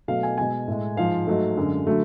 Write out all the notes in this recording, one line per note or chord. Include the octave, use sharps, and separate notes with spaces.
B2 F#3 A3 F5
G#5
B2 G#3 G#5
A2 G#3
G#2 F3 G#3 F5
G#2 F#3 A3
F#2 D3 G#3
D3 F#3 A3